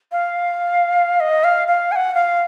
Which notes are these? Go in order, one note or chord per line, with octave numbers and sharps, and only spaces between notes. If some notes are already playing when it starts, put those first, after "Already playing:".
F5
D#5
F5
F5
G#5
F#5
F5